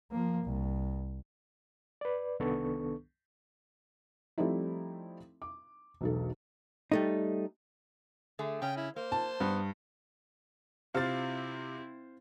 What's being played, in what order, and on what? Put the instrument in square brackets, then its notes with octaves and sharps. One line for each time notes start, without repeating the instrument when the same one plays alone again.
[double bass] F3 A#3
C2
[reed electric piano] B4 D5
C2 D#3 B3 D4 A4 C#6
[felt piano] F3 G3 A3 C4 D#4 E4
D6
E1 B1 A4
[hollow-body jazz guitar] G3 A3 D#4
[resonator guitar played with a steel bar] D3 A3 G#4
[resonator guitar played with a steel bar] C#3 C#4 [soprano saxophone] G5
[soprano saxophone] E4
[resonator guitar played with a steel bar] A#3 [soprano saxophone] C5
[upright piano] A5
[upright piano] G2 [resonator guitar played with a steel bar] B3
[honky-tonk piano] C3 F4 A6 [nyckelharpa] C4 E4 [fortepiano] C5 F5